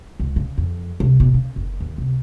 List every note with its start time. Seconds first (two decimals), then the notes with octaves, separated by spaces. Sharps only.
0.20 C#2
0.36 C#3
0.58 F2
1.00 C2
1.20 B2
1.34 C#3
1.56 F#1
1.80 D#2
1.98 C2